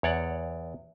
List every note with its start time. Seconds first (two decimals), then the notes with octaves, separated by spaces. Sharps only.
0.03 E2 C#5 D5 F#5